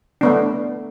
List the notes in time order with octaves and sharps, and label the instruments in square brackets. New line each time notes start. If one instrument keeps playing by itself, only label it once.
[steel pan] A3 B3 D4